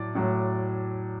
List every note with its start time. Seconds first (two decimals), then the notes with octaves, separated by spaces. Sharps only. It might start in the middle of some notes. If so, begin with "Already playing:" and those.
Already playing: A2 F#3 D5
0.15 A2 F#3